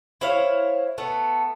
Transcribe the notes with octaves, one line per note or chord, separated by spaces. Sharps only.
E4 C5 C#5 F5
A3 B3